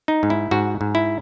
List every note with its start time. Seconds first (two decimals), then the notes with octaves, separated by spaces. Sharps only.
0.08 D#4
0.23 G#2
0.30 E4
0.51 G#2 F#4
0.81 G#2
0.95 E4